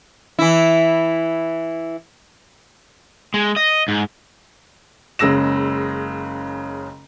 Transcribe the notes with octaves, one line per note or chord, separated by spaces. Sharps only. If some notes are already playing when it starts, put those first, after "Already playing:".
E3 E4
G#3
D#5
G#2
F#1 C#3 G#3 E6 A#6 E7